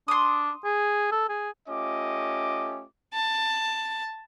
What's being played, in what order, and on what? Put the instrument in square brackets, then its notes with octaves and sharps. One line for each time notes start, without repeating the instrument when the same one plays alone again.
[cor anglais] D4 [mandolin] C6 D#6
[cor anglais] G#4
A4
G#4
[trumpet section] A3 C#4 F4 G4 D#5 D6
[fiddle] A5